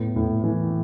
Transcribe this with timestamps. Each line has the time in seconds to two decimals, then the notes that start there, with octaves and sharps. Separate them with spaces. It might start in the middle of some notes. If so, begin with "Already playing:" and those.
Already playing: A2 B3
0.16 A2
0.44 E3